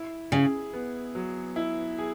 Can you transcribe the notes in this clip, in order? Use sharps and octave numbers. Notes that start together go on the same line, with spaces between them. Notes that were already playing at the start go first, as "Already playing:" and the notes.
Already playing: E4
C#3 G#4
B3
F#3
E4
G#4